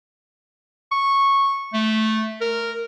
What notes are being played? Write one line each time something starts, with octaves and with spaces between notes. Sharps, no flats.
C#6
A3
A#4